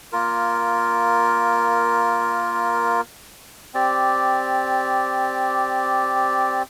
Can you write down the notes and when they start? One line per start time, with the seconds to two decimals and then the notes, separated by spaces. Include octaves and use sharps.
0.12 A#3 F4 A#4
3.74 C4 G4 D5